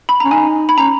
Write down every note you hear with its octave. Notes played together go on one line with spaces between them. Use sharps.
B5
C#4 A#5
D#4 G#5
B5
C#4 A#5